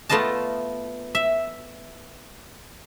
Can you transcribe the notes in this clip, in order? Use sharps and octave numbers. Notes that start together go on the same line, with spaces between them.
A3 B3 F4 D#5 A5
E5